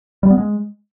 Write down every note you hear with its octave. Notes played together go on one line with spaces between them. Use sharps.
G3
B3
G#3